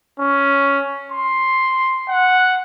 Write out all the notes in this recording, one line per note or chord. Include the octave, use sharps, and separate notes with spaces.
C#4
C6
F#5